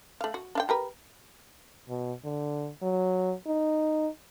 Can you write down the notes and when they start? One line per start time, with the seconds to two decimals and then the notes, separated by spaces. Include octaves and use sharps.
0.21 A3 F5
0.34 F#4
0.55 D4 F5 G5
0.69 G4 A#4 B4
1.89 B2
2.25 D3
2.83 F#3
3.47 D#4